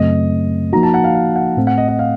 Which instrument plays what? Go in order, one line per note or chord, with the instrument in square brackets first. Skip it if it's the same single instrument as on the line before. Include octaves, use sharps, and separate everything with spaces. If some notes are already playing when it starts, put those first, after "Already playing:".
Already playing: [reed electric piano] F#2 C#3 F#3 A3 C4 [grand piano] D#5
[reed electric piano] F3 A#3 D#4 F#4 [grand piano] A#5
[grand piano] A5
F#5
F5
F5
F#5
[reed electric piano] A2 A3 C4
[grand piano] F#5
D#5
D#5
F5